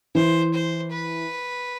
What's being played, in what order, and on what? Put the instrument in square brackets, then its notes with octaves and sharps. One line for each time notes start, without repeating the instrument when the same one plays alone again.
[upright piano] E3 [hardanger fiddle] C5
[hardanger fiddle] C5
B4